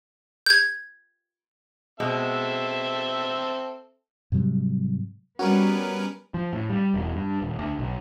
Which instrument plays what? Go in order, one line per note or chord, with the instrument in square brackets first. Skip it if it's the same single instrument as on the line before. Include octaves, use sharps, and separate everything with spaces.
[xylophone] G6 G#6
[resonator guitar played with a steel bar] B2 G#3 [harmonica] C4 A4 E5
[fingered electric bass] G#2 C3 F#3 G3
[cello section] G3 B3 [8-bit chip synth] C#4 A#4 B4 [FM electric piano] F#4
[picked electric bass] F3
A2
G3
E1
G2
D#1
D2
B1